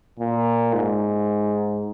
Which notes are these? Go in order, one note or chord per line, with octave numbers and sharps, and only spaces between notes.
A#2
G#2